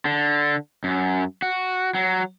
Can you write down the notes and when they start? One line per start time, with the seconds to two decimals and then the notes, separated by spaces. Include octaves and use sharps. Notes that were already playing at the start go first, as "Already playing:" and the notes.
0.05 D3
0.84 F#2
1.42 F#4
1.95 F#3